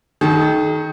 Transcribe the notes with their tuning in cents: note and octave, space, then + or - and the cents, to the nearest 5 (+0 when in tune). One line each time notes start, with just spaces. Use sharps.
D#3 +0 A4 -45